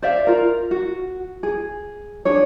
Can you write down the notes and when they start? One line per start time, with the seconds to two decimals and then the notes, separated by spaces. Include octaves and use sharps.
0.02 C5 D5 E5 F5
0.27 F4 A#4
0.71 F#4
1.43 G#4
2.25 D4 G#4 C#5